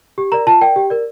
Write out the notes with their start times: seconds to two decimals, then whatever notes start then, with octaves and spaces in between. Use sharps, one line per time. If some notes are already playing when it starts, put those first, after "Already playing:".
0.18 G4
0.32 A#4 D5 A#5
0.47 F4 A5
0.61 A#4 D5 G5
0.76 G4
0.90 A#4 D5